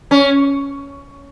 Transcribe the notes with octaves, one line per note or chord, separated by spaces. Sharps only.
C#4